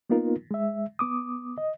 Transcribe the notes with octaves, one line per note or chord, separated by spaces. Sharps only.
A#3 B3 D#4 F4 A#4
G#3 E5
B3 D6 D#6
D#5